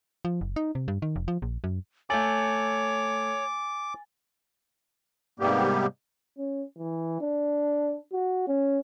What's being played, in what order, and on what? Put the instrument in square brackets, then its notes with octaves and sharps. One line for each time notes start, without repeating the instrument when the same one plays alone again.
[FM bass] F3
F#1
D#4
C3
G2
D#3
F1
F3
A#1
F#2
[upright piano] A3 A4 [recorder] C#5 [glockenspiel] G#5 A6 F#7 [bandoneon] D6
[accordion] G#2 C3 G3 A#3 B3 G4
[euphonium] C#4
E3
D4
F#4
C#4